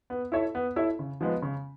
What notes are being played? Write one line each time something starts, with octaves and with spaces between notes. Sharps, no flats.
B3
E4 A4 C#5 E5
B3
E4 A4 C#5 E5
C#3
F3 G#3 B3
C#3